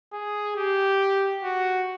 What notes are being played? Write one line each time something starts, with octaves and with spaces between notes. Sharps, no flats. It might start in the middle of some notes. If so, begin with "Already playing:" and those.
G#4
G4
F#4